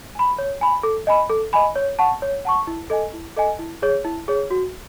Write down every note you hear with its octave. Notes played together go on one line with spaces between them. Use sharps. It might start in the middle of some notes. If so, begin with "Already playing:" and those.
G#5 B5
C#5
G#5 B5
A4
D#5 G#5 B5
A4
D#5 G#5 B5
C#5
F#5 A5 C#6
C#5
F#5 A5 C#6
E4
A4 D#5 G#5
E4
A4 D#5 G#5
E4
G#4 C#5
E4
G#4 C#5
F#4